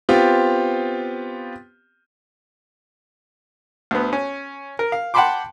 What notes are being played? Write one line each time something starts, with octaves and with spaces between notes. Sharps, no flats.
B3 C4 F4 G4
D2 B3
C#4
A#4
F5
F#5 G5 A5 B5 C6 D6